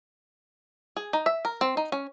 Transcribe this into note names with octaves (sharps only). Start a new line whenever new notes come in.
G#4
D#4
E5
A#4
C4
D#4
C#4